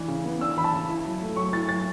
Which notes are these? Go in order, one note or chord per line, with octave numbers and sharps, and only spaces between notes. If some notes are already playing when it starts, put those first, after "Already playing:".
Already playing: E3 D4
C#3
B3
D4 E6
E3 B5
A5
C#3
E4
F#3
A3
F#3 C#6
E4 A6
F#3 A6